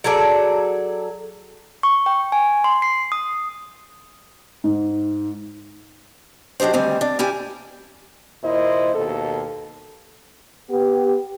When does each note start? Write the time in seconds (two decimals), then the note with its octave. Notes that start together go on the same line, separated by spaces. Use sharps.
0.04 F#3 G#4 A4 D5
1.83 C#6
2.06 G5
2.32 G#5
2.64 C6
2.82 C7
3.12 D#6
4.64 G#2
6.60 F#3 D4 D#4 G4 C5
6.73 D2 D#3 G3 C4 G#5
7.01 D4 D5
7.19 C#4 E4 G4 G#5
8.44 D#2 A#2 E4 C5 D#5
8.93 D#2 B2 A4
10.70 B3 G4